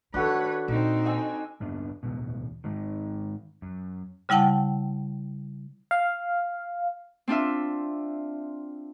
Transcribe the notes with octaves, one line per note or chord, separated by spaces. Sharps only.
D#3 D4 F#4 A4 B4 C#5
A#2 C4 D#4
G#5 E6
E2 G2 B3 D4
D1 E2 B2
G#2 D#3
F#2
C#3 G3 E4 F#5 G5 A5
F5
C4 D4 F4 E5